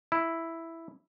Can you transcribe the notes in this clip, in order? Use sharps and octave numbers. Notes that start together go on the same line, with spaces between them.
E4